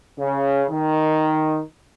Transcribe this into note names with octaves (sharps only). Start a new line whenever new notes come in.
C#3
D#3